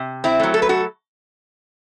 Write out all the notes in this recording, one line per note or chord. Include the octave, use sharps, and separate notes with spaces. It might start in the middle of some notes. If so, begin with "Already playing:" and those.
Already playing: C3
C4 E4
F#3 A3
A4
B4
F#4 A4